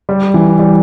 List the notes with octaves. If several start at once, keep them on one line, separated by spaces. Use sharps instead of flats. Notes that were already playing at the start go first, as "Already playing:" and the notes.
G3
E3
G3